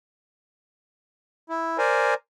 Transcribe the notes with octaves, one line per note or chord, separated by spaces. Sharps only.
E4
A#4 C5 D5 G#5